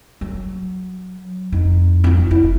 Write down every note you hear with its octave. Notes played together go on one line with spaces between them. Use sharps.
F#3
F2 D#4
C4 F4
F#1 E4